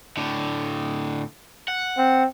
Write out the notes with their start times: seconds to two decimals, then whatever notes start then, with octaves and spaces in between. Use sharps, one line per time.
0.17 A2 D3
1.68 F#5
1.98 C4